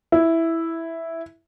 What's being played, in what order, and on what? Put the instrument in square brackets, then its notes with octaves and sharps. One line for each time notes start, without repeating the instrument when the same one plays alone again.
[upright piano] E4